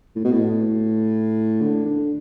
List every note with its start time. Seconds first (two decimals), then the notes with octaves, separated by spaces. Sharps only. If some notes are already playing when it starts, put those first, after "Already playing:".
0.16 A2
0.24 B2
0.32 A2
1.61 D3
1.86 D3